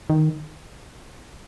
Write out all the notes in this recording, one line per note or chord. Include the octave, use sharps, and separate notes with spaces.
D#3